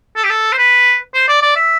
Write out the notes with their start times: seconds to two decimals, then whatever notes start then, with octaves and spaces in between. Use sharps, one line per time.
0.16 A4
0.24 G4
0.30 A4
0.52 C5
0.58 B4
1.14 C5
1.28 D5
1.42 D5
1.56 E5